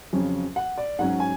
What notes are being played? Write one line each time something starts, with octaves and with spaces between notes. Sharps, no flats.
F2 C#3 F#3 C#4
F#5
D5
G#2 F#3 C#4 F#5
G#5